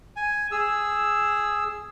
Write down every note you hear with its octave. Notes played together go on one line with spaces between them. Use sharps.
G#5
G#4 E6